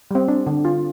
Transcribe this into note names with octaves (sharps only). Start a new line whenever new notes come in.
G3 C4
D4
D3
F4